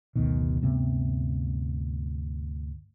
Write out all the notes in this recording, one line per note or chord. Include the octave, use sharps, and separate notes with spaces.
F#1 D2 B2 D#3
D2 G2 C3 B3